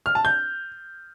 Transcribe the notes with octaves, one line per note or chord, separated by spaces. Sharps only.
F6
A5
G6